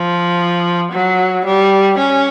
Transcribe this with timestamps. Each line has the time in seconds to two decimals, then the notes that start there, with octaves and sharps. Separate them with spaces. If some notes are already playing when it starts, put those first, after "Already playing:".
Already playing: F3
0.92 F#3
1.46 G3
1.98 C#4